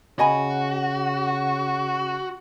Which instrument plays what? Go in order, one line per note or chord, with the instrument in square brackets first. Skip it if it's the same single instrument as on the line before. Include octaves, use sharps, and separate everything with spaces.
[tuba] C#3 [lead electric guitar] F#4 [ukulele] D#5 G#5 B5